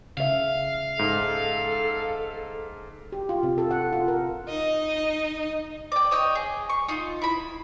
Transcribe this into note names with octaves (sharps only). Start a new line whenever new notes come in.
C#3 E5 F5
G#2 A4
G4
F4
C3
A4
F#5
F4
A#4
D#4 D#5
D5 G5
C#5 D#5 G5
G#4
C#6
D#4 F4
E4 B5